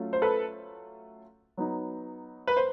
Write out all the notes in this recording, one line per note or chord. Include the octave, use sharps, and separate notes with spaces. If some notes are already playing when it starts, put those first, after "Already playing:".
Already playing: F#3 A3 C#4 F4
C5
A4 B4
F#3 B3 D#4
B4
C5